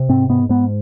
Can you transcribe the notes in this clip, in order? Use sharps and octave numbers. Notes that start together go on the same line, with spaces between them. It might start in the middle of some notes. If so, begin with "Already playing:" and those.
Already playing: C3
G#2 C4
G#2 B3
G#2 B3